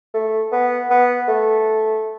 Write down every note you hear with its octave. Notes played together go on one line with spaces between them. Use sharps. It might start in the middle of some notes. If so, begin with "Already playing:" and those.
A3
B3
B3
A3